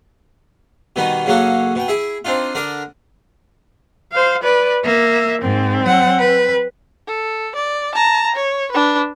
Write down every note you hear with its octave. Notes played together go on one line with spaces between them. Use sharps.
B2 D#3 G3 B3 D#4
C#3 F#3 A#3 C#4 F#4 A4
B2 G5
E4 G#4 E5
C4 D4 D#4 F4
D3 D4 A#4 D6
C5 F5
B4 D5
A#3 E5
G#2 C4
F#3 F#5
B4
A4
D5
A5 A#5
C#5
D4 B4